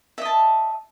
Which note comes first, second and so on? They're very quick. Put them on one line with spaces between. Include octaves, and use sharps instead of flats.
E5 D#5 A5